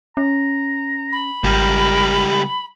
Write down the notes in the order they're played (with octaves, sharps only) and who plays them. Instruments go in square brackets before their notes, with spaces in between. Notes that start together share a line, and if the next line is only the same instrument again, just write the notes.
[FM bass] C#4 [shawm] A#5
[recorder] B5
[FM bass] G#1 [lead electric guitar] C#2 G3 [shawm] A#4